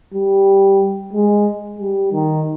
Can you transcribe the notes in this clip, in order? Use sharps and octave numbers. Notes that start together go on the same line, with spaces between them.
G3
G#3
G3
D#3